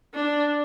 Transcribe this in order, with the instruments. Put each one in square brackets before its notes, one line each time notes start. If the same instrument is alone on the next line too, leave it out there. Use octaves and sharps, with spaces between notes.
[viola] D4